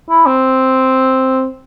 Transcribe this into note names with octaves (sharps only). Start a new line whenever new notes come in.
E4
C4